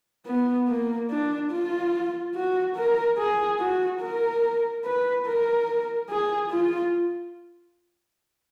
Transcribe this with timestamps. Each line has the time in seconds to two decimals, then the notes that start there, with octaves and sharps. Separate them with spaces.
0.26 B3
0.68 A#3
1.10 D4
1.51 F4
2.35 F#4
2.76 A#4
3.18 G#4
3.60 F#4
4.01 A#4
4.85 B4
5.26 A#4
6.10 G#4
6.51 F4